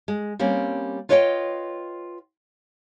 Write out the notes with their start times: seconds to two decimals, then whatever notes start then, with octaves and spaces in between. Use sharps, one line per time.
0.08 G#3
0.39 G3 A#3 C4 C#4
1.09 F4 B4 C#5 D#5 E5 G5